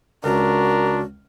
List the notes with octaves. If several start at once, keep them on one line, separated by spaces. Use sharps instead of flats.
C#2 D4 F#4 A#4